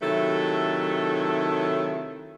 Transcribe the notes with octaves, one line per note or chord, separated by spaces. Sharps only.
C3 D#3 F#3 A3 E4 A4